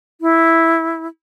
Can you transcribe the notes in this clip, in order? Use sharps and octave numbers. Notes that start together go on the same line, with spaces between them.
E4